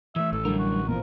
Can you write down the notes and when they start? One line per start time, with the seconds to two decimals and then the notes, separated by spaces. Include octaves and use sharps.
0.16 E3 A3 E5
0.33 A1 A4
0.45 D3 F#3 G3 A#4
0.59 F#4
0.88 A#2 F3 A#4